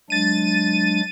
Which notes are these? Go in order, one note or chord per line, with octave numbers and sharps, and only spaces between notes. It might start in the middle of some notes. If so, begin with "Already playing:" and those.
F#3 G#3 D4 A6 D#7